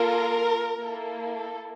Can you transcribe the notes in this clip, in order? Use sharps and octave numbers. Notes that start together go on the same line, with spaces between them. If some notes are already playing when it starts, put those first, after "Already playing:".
Already playing: A#3 F4 A4 A#4
A#3 E4 A4
A4